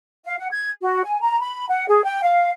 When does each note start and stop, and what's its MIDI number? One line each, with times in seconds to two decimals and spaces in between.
0.25 0.36 77
0.38 0.49 78
0.51 0.70 92
0.82 1.03 66
1.04 1.20 80
1.21 1.40 82
1.41 1.66 83
1.69 1.87 78
1.88 2.04 68
2.04 2.20 79
2.22 2.51 77